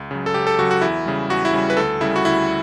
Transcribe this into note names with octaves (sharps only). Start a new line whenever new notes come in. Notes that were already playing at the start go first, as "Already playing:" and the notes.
Already playing: C#2
C#3 F#3
A4
C#2 G4
A4
C#3 F#3 F#4
F#4
E2 E4
C#3 G3
E2 F#4
E4
C#3 G3
B4
D2 A4
C#3 G3 E4
F#4
D2 E4